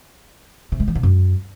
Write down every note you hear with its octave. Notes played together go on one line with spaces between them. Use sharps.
C3
G#3
E3
C3
F#2